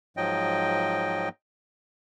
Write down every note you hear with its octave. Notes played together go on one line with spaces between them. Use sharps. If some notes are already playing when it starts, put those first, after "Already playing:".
G#2 F3 F#3 D#5 G5